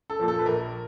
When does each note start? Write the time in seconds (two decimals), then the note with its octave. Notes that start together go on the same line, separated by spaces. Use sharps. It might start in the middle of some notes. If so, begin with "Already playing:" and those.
0.10 A4
0.19 A#2 F3
0.28 A4
0.39 B4
0.46 A#1 A#4